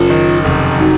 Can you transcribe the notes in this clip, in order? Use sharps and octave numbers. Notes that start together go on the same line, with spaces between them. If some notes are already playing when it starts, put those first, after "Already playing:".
Already playing: F#1 F4
D#3
F1
F#3 D#4